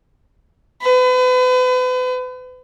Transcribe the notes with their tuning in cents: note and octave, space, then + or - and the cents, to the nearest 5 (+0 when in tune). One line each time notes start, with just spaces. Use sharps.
B4 +35